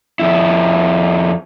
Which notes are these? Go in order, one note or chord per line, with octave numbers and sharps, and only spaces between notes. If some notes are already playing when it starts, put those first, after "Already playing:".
F2 E4